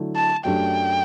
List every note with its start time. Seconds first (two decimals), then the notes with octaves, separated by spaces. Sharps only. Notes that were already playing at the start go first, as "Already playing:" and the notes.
Already playing: D3 F#3 A3 E4
0.16 A5
0.44 F#2 F#3 A3 D4 G4 G5